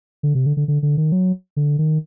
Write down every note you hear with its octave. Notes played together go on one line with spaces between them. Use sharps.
D3
C3
D3
D3
D3
D3
D#3
F#3
D3
D#3